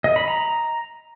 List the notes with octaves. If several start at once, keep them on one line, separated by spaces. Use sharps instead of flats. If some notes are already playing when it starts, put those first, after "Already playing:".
D#5
B5
A#5